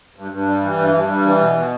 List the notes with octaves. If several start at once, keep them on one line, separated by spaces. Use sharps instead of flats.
G2
G2
G3
E3
G2
G2
G3
E3
B2
B2